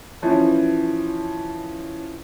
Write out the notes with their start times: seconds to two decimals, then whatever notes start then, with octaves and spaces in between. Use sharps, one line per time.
0.22 E3 F3 C#4